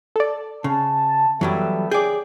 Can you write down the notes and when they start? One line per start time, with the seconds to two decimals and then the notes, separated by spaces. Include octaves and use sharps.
0.16 A4 D5
0.64 C#3 A5
1.41 F#2 E3 F#3 G3 B3 A4 E5
1.91 D#2 C#3 G#4 D5 G5 D6